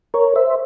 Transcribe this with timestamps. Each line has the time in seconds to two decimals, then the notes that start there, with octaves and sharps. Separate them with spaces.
0.14 A#4 C#5
0.36 C5 E5